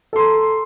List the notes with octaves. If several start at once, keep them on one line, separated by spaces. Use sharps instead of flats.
A4 A#5 C6